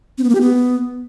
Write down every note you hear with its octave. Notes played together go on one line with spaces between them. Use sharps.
C4
B3
A#3
G4
B3